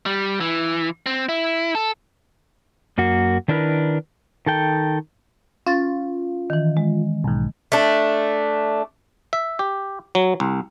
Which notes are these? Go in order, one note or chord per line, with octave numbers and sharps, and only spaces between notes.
G3
E3
C4
E4
A4
F#2 A#3 F#4
D#3 D4 E4 A#4 B4
D#3 A4 G5
C#4 F4 A6
D#3 E3
G#3
B1 G#2
A3 D4
E5
G4
F#3
C2